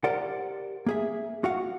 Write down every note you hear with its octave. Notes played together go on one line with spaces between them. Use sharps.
G4 A#4 C5 D5 F#5
A#3 G#4 E5
F#4 F5 F#5